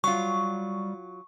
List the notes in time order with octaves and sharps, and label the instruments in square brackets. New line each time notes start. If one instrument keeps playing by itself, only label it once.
[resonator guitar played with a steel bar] F#3 F4 [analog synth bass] G3 [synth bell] C#6